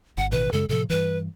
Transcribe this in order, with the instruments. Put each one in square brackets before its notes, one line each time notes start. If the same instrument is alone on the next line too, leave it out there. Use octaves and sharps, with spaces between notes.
[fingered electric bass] G1 [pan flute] F#5
[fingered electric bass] A1 B2 D#3 [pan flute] B4
[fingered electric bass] F#2 C#3 G#3 [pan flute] A4
[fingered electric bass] A2 C3 F3 [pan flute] A4
[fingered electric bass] G2 E3 [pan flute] B4